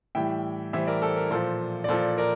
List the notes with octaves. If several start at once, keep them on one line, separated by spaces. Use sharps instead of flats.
A2 E3 G3 E5 G5
A2 E3 G3 C5 E5
A#4 D5
A4 C5
A#4
A#2 F3 A4 C5
D5
A#2 F3 A4 C5
A#4 D5